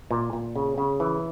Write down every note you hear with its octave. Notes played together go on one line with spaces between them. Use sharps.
A#2
A#2
C#3
C#3
E3